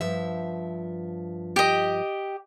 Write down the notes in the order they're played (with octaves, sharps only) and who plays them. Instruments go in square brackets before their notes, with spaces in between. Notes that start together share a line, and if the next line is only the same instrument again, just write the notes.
[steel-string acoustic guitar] G2 F3 E5
[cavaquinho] G4 D#5